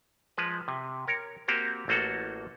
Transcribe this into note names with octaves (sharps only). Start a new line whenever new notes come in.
F3 G#3 B4
C3
A#4 C#5
A#3 C4 F#4 G4
A1 A3 A#3 F#4 A4